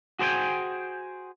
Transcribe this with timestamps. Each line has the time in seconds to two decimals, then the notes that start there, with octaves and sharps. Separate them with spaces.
0.19 F#4 G#4 C5 D5 G5 G#5